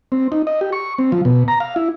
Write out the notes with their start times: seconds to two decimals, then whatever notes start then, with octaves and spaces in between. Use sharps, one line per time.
0.12 C4
0.32 D#4
0.47 D#5
0.61 G4
0.73 C#6
0.98 C4
1.12 F3
1.25 B2
1.48 A#5
1.60 F5
1.76 E4